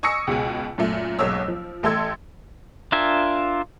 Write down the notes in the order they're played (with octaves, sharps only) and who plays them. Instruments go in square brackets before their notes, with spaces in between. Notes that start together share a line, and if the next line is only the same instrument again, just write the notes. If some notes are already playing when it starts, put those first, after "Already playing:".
[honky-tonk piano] G#5 C#6 D#6 E6 A#6 C#7
C#2 B2 G#3 G#5
F#2 A#2 A3
F#1 B1 G#2 C#5 E6
F3
A1 A3 A4 C6 E6 G#6
[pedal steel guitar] D4 F4 A#4 E5 G#5